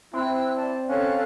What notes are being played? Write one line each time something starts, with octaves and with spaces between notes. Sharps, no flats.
C4 E4 G5 E6 F#6
D5 A5
C#4 A4 F5 F#6